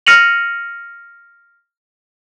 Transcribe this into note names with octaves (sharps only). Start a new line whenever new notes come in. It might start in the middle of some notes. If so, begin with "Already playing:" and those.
F6 A#6 C#7 D#7 F7 F#7